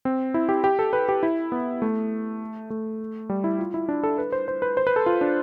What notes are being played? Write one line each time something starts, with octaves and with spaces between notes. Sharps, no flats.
C4
E4
G4
G4
A4
B4
G4
E4
B3
A3
A3
G3
E4
F4
E4
D4
A4
B4
C5
C5
B4
C5
B4
A4
F4
D4